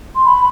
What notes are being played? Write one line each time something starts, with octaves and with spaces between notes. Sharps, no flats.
C6
B5